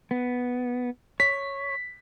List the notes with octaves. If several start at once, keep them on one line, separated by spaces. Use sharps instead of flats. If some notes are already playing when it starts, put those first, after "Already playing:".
B3
C#5 B6